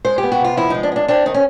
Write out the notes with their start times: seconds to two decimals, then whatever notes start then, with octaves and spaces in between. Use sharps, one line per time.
0.05 G#3 C5
0.18 G4
0.23 B3
0.32 F#4
0.40 C3 F4
0.57 F3 E4
0.70 G#3 D#4
0.83 D4
0.92 B3
0.96 D4
1.08 C4 D4
1.26 D#3 D#4
1.34 C#4